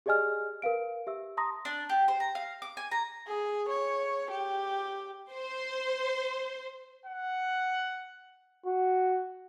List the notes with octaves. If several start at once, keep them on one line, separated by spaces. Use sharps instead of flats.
G4 G#4 D5 D#5 G#5 F6
A#4 B4 F5 D7
G4 E5 E6
A5 A#5 C6 D#6 A#6
D4
G4
C5
A#5
F5
D6
G#5
A#5
G#4
C#5
G4
C5
F#5
F#4